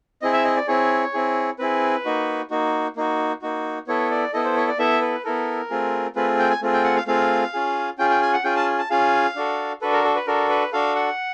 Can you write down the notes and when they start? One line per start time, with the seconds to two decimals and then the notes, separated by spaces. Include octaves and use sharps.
0.22 C4 E4 G#4 D#5
0.33 E5
0.44 D#5
0.56 D5
0.68 C4 E4 G#4 C#5
1.14 C4 E4 G#4
1.59 C4 E4 G#4 B4
2.05 A#3 D#4 F#4
2.50 A#3 D#4 F#4
2.96 A#3 D#4 F#4
3.42 A#3 D#4 F#4
3.87 B3 E4 A4 C#5
4.11 D5
4.33 B3 E4 A4 D#5
4.45 C5
4.56 C#5
4.68 D5
4.79 B3 E4 A4 E5
5.02 B4
5.24 B3 E4 A4 A#4
5.70 A3 C4 F4 G#4
6.16 A3 C4 F4 G#4 B4
6.39 G5
6.50 G#5
6.62 A3 C4 F4 G#4
6.73 G5
6.84 F#5
6.96 F5
7.07 A3 C4 F4 G#4 F5
7.53 C#4 F4 G#4
7.98 C#4 F4 G#4 G5
8.10 G5
8.22 G#5
8.33 F#5
8.44 C#4 F4 G#4 G5
8.56 A5
8.79 A5
8.90 C#4 F4 G#4 F5
9.36 D4 F#4 A4
9.81 D4 F#4 A4 B4
9.93 A#4
10.04 A4
10.16 B4
10.27 D4 F#4 A4 A#4
10.49 B4
10.73 D4 F#4 A4 F5
10.95 F#5